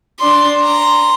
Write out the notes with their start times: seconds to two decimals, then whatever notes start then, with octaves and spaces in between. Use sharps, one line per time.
0.20 D4 C6
0.62 A#5 C6